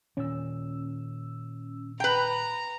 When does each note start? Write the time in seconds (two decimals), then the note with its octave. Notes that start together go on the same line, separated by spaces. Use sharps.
0.17 A#2 D#3 C#4 E6
2.00 B4 G5 A#5